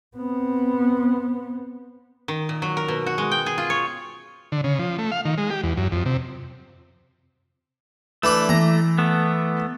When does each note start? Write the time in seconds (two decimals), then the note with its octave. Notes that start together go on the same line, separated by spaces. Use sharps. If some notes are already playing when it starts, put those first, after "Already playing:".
0.17 B3 C4
2.28 D#3
2.49 A#2
2.62 F#3
2.77 A#4
2.88 B2
3.07 F#4
3.18 G#3
3.32 G5
3.46 G#4
3.58 F4
3.70 C#5
4.52 D3
4.64 C#3
4.79 F3
4.98 A3
5.12 F5
5.25 D#3
5.38 G#3
5.50 G4
5.63 E2
5.77 F#2
5.92 F2
6.06 C3
8.23 E3 A3 D4 B5
8.49 E3 A#5
8.98 A3 B3